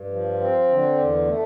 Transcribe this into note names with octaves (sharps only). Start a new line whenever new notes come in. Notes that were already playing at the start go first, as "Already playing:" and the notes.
Already playing: G2
F3
C4
D3
E2
A3